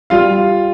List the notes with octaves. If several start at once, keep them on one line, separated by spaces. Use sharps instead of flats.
G3 F4 F5